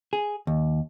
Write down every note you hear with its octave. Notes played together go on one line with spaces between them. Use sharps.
G#4
D#2